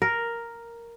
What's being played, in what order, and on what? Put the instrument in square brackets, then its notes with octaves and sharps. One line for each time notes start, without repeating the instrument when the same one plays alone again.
[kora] A#4